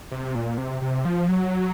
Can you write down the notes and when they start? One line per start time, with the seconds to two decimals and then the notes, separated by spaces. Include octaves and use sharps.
0.11 C3
0.35 A#2
0.58 C3
0.82 C3
1.05 F3
1.29 F#3